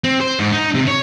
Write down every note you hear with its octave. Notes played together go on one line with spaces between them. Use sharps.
C4
C5
G#2
D#4
C3
C#5